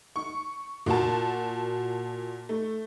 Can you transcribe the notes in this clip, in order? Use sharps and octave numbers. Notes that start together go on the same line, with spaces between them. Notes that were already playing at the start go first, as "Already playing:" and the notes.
C#6
A#2 F#4 A5
A3